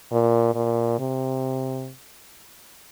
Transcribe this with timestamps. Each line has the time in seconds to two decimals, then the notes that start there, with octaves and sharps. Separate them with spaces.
0.12 A#2
0.55 A#2
0.99 C3